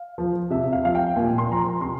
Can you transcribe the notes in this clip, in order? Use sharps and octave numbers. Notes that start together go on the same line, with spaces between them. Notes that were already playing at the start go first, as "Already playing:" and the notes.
Already playing: F5
F3
C3 E5
F5
F3 F5
G5
A#2 G#5
C6
F3 A#5
C6
C3 C6